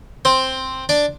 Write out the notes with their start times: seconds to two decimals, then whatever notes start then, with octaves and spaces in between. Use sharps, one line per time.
0.25 C4 C5
0.89 D4 D5